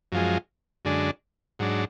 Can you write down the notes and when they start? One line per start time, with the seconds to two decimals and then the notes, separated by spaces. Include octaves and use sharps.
0.12 F#2 F3 G#3
0.85 F#2 D3 G#3 D4
1.59 G#2 F#3 D4